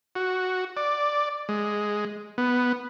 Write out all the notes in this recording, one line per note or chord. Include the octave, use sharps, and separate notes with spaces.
F#4
D5
G#3
B3